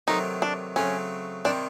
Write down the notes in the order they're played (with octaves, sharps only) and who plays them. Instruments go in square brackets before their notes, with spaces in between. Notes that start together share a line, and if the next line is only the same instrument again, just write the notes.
[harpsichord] C3 D#3 F#3 A3 C4 [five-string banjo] D#4
[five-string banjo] D4
[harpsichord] C#3 F#3 A3 C4 [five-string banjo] C#4
[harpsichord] C3 D#3 G3 C4 [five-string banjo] D4